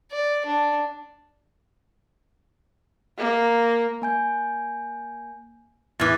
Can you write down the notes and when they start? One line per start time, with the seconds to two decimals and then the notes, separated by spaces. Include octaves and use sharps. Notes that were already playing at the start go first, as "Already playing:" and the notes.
0.12 D5
0.46 D4
3.18 A#3
4.02 A#3 G#5 G6
6.00 E2 E3 D6 G#6 A6